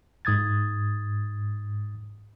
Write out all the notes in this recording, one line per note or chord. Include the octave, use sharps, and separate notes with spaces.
G#2 D#6 G#6 A6